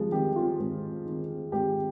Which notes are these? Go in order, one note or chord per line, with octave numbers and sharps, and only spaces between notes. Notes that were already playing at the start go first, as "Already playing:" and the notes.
Already playing: G#2 F3 G3 G#3
D#3 G4
F4
G#2
D#3
G#2 G4